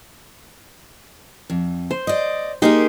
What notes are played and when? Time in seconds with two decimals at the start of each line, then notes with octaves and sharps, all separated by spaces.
1.50 F2
1.91 C5
2.07 D5 D#5
2.62 A#3 D#4 G4 G#4 A#4 C6